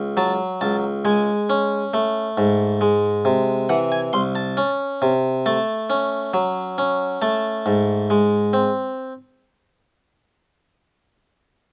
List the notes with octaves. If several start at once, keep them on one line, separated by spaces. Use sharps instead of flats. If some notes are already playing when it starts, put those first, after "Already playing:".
Already playing: C#2
F#3 A5
C#2 A5
G#3 G#5
C#4
A3
G#2
G#3
C3
E3 F#5
G#5
C2 C6
A5
C#4
C3
A3 A5
C#4
F#3
C#4
A3 A5
G#2
G#3
C4